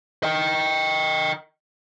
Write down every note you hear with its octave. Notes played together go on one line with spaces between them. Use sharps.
D#5 G5